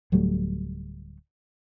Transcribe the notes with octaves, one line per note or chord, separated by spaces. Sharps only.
D1 F#3 G3 A3